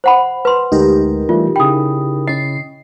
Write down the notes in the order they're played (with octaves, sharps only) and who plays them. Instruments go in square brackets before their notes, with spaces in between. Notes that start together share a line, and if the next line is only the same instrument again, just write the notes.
[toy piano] C5 F#5 B5
B4 C6
[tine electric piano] D2 G#3 [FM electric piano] D#4 G4 A#4
[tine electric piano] E3 G3 A3 [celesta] F4
[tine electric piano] C#3 E4 B5 [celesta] G5 D#6
[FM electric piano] C#4 C7 [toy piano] D#5